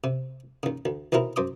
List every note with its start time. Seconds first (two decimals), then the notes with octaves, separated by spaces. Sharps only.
0.04 C3
0.63 D#2 C#3
0.85 D2
1.12 D#2 B2 C4 E4 A#4
1.36 F#2 C5 D6 D#6